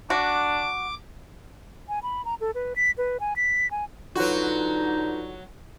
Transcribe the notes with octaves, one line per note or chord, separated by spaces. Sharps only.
D4 F#4 D6
G#5
B5
A#5
A4
B4
B6
B4
G#5
B6
G#5
D3 F#3 D#4 F4 F#4 B4